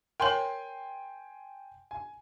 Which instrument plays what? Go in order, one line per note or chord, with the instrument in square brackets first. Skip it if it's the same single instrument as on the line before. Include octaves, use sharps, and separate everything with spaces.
[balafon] A#4 C#5 [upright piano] G5 G#5 C6
[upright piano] G#5